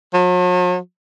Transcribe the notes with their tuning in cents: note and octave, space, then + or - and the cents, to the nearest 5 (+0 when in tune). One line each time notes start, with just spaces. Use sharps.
F#3 -45